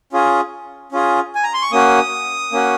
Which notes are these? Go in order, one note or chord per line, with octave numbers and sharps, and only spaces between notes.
C#4 F4 G#4
C#4 F4 G#4
G#5
A#5
C6
C#6
A#3 C#4 F#4 D#6
A#3 C#4 F#4